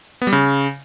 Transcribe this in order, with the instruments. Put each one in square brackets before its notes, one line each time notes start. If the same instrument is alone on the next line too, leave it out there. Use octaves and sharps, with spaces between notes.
[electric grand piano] B3
G3
C#3